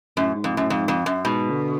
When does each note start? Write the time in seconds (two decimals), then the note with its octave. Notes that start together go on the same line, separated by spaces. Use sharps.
0.17 F#2 A2
0.35 G#2
0.44 F2
0.52 A2
0.57 F#2
0.70 F2 G#2
0.88 F2
1.06 F#2
1.25 G#2 B2
1.51 D3